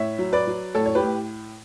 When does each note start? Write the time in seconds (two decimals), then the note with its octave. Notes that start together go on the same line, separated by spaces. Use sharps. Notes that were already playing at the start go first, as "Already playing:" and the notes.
Already playing: A2 C#5 E5
0.19 F#3
0.32 B4 D5
0.47 F#3
0.75 A2 A4 C#5
0.86 C#5
0.95 G4 B4
1.03 A2